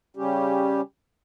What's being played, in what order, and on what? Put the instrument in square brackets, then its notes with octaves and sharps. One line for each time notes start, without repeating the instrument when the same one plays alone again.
[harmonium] C#3 G3 C#4 G4